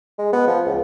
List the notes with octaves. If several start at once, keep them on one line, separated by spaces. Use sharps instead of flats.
G#3
B3
F3
C#2